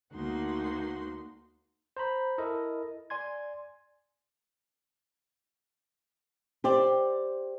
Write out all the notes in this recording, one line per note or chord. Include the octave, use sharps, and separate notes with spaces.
D2 A#3 D#4 F#4 C6
C5 A#5 B5
E4 A4 A#4 D#5
D5 G#5 C6 G#6
G4 C5 D5